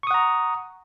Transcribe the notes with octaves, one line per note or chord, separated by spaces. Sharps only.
F#5 A#5 C#6 D#6